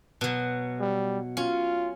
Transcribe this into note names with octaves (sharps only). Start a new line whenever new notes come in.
B2 F#3
G3
C#4 F4